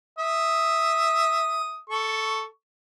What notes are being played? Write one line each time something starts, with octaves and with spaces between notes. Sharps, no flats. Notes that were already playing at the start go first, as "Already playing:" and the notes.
E5 D#6
A4 C#6